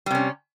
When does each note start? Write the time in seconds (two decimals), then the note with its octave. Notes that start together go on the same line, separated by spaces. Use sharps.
0.06 G3
0.11 C3
0.15 C#4